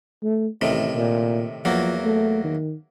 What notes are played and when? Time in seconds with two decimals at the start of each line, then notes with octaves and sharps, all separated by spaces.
0.23 A3
0.61 A1 A2 C3 D#3
0.96 A#2
1.65 E2 F3 F#3 A#3
2.04 A3
2.44 D#3